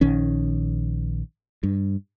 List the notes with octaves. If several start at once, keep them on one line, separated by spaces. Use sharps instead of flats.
A#1 D#3 C#4
G2